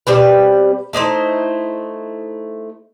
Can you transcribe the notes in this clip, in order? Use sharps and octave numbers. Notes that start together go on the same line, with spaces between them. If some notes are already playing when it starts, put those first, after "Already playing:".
B2 G3 C4 B4
A3 D#4 E4 C5